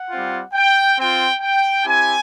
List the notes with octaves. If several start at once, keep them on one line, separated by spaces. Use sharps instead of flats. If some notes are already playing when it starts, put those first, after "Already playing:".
Already playing: F#5
G3 C4 F4
G5
C4 F4 G5
G5
C4 E4 G4 G#5